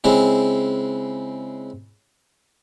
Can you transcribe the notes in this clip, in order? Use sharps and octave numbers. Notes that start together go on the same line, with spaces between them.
C#3 G#3 C4 E4